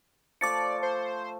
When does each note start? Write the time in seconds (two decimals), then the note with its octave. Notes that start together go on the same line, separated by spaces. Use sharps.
0.41 F3 A3 D5 A5 D6 A6 C#7
0.83 C5